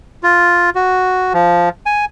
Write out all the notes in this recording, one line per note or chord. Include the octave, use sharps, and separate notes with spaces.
F4
F#4
F3
G#5